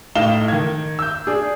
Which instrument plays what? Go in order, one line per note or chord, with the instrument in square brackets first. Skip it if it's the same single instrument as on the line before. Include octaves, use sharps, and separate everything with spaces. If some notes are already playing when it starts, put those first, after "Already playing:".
[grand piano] A2 D#4 F5 E7 G7
D#3 G#6
E6 G6
D4 G#4